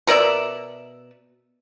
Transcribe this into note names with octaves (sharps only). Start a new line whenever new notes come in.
B2 A#4 D5 E5